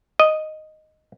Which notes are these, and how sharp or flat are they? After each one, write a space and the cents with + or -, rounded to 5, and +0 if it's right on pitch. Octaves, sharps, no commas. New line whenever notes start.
D#5 -5